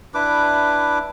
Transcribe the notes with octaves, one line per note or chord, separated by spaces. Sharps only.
D4 E4 B4 D6